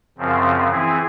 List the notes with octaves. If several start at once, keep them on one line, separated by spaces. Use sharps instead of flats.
F#2 C#3 F3 C4
E3 C4 E4 G#4